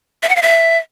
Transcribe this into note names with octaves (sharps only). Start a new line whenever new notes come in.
E5
F#5
F5
E5